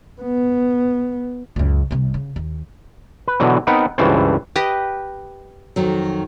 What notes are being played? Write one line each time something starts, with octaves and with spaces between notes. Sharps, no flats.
B3
C#2 F#2
C2 C3
C#3
D#2
B4
B2 D3 E3 F#3
B3 C4 D#4 A#4 B4 F#5
C#2 G2 E3 C#4 A4 C5
G4 B4 D#5
F2 D#3 F#3